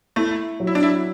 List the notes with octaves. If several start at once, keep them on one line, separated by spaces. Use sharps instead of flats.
A3 E4
F#3
E4
D4
E4